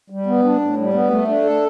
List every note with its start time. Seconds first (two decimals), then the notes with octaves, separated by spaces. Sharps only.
0.10 G3
0.26 B3
0.44 D4
0.60 A2
0.77 G3
0.94 B3
1.10 A3
1.28 D4
1.44 A4